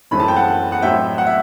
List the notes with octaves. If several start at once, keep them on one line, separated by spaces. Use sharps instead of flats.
F#1 F#2 E3 A3 C4 B5
A5
G5
F#5 A5
F#5
A1 A2 F#3 C4 E5 G5
F#5
E5